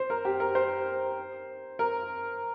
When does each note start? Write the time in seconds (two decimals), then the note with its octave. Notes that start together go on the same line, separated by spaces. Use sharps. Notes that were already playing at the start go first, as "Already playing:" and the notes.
Already playing: C5
0.10 A#4
0.25 G4
0.40 A#4
0.55 C5
1.79 A#4